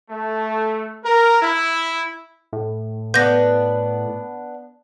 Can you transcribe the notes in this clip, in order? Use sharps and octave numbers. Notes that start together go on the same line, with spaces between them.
A3
A#4
E4
A2
B3 D4 B4 G6 A#6